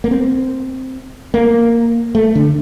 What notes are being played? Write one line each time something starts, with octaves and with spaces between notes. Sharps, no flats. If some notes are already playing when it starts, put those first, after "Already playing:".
A#3
C4
A#3
A3
D3